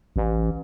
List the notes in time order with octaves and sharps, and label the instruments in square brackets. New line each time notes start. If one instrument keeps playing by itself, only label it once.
[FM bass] A1